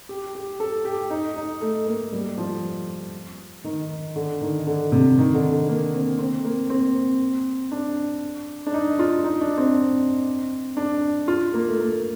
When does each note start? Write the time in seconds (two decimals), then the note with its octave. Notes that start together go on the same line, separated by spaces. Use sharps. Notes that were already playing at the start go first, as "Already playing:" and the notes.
0.09 G4
0.35 G4
0.60 A4
0.85 G4
1.10 D#4
1.36 D#4
1.61 A3
1.86 A#3
2.13 G3
2.38 F3
3.64 D#3
4.16 D3
4.42 D#3
4.67 D3
4.92 C3
5.18 D#3
5.34 D3
5.52 D3
5.69 A#3
5.94 C4
6.19 C4
6.45 A#3
6.70 C4
7.72 D4
8.67 D4
8.74 D#4
8.99 F4
9.24 D#4
9.41 D4
9.58 C4
10.77 D4
11.28 F4
11.54 A#3
11.68 A3
11.79 A#3